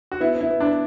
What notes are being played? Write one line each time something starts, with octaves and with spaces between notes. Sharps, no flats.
F#4
B3 E4
B3
E4
B3
D4
B3